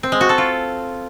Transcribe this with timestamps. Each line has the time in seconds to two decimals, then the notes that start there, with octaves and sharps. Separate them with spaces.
0.03 C4
0.12 G#3
0.21 F#4
0.29 A4
0.38 F4